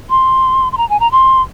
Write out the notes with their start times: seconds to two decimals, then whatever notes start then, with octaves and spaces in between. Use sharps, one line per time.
0.10 C6
0.72 C6
0.77 A#5
0.89 G#5
1.00 A#5
1.11 C6